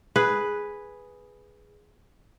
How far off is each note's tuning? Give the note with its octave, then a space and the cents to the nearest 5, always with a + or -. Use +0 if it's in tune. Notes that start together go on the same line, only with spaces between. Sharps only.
G#4 +0 B4 +0